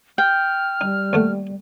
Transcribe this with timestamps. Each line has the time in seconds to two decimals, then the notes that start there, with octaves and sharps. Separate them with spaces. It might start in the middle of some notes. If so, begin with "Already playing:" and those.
0.18 G5 F6
0.81 G3 D#4
1.13 D#2 A3 F#5